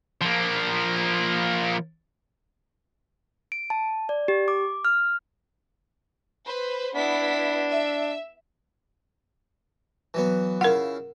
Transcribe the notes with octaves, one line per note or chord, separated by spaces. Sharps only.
F3 A#3
D7
A5
D5
G4
D6
F6
B4 C5
B3 D4 E4 B6
E5
E3 F#3 B3
C#3 E4 F4 A#4 F#5